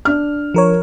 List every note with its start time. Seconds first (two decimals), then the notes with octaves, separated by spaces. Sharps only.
0.05 D4 F6
0.54 F3 A#4 C#5